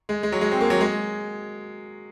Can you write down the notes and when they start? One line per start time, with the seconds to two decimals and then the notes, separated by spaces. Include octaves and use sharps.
0.09 G#3
0.23 G#3
0.32 F#3
0.41 G#3
0.51 C4
0.61 A#3
0.70 F#3
0.81 G#3